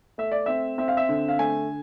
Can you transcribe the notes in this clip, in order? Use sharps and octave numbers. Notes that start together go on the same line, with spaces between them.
A3 E5
D5
C4 E5
C4 E5
F5
E5
D3
F5
A3 G#5